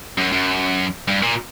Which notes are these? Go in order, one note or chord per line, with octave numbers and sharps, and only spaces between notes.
F#2
F#2
G2
A#2